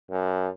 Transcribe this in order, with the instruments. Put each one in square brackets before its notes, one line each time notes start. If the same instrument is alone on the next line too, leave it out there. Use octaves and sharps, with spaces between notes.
[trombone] F#2